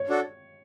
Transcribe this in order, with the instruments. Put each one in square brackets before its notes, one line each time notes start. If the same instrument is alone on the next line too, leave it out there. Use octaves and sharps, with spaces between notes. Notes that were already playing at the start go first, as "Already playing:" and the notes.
Already playing: [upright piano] C#5
[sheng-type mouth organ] D4 F#4 A4